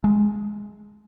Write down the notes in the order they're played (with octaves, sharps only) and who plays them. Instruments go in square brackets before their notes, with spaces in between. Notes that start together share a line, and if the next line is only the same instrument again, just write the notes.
[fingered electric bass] G#3